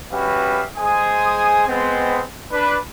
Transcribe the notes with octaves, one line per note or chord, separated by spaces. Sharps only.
G3 C#4 F#4 B4 E5 F5
G#3 G#4 C5 G#5 D#6
G#3 B3 C4
D4 B4